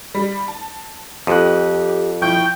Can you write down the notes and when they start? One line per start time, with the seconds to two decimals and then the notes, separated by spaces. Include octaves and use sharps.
0.15 G3
0.48 A5
1.27 F2 G4 D#6 F#6
2.22 F3 E4 G5 C#6 G6